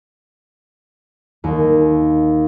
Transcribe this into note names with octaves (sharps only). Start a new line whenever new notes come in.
D#2